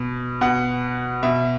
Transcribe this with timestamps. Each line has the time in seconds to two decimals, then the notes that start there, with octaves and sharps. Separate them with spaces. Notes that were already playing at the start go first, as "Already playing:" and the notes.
Already playing: B2
0.41 B2 F#5
1.23 B2 E5